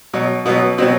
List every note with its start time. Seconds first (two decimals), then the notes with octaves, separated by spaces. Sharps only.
0.14 B2 F#3
0.46 B2 F#3 B3
0.78 B2 F#3 C4